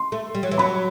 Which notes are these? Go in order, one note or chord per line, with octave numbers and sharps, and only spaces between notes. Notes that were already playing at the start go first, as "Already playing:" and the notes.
Already playing: C6
A3
G3
F#3
E3
F#3 B5